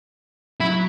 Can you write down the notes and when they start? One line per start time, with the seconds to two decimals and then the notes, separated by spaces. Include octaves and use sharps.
0.60 F#3 E4